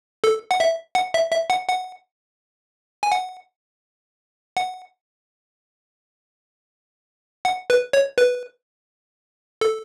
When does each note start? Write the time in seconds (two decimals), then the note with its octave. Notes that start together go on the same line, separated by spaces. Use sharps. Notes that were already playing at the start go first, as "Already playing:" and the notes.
0.24 A4
0.51 F#5
0.60 E5
0.95 F#5
1.14 E5
1.31 E5
1.50 F#5
1.68 F#5
3.03 G#5
3.12 F#5
4.57 F#5
7.45 F#5
7.70 B4
7.93 C#5
8.18 B4
9.61 A4